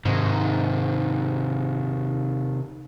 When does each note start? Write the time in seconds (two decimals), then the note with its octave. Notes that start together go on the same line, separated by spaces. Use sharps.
0.05 G#2 C3 D#3